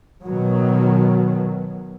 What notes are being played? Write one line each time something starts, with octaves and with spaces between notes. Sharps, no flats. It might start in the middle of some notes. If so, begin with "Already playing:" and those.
B2 D#3 F#3